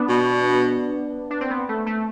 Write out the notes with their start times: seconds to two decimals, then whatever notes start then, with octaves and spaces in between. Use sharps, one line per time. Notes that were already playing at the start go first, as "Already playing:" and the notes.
Already playing: B3 D4
0.09 B2
1.30 D4
1.41 C4
1.50 B3
1.69 A3
1.86 A3